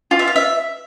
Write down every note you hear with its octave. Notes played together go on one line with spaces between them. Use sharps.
F4
E5
F5
E5